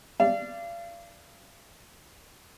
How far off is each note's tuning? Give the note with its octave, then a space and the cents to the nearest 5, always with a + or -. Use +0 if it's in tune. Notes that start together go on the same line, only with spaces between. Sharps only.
D5 +0 F5 -35